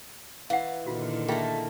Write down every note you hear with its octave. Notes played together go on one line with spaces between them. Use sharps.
E3 F5 F#5
A#2 D3 D#3 F4 F#4
A2 A3 A#3 F4 G#4 G5